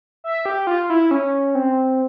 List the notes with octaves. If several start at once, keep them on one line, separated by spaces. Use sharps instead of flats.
E5
G4
F4
E4
C#4
C4